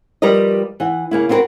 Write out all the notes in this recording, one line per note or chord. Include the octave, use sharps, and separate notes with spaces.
F3 G3 G4 A#4 B4 D#5
E3 F#5
C#3 A#3 E4
B3 C4 E4 F#4 A#4 B4